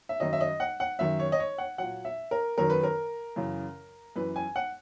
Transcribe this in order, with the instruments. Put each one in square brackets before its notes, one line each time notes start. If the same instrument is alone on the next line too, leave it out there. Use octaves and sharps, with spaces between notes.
[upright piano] E5
F#2 D#3 F#3 D#5
E5
D#5
F#5
F#5
F#2 D#3 F#3 E5
C#5
D#5
C#5
F#5
A#2 F#3 F#5
E5
A#4
F#2 D#3 F#3 A#4
B4
A#4
F#2 C#3 E3
F#2 E3 B4
G#5
F#5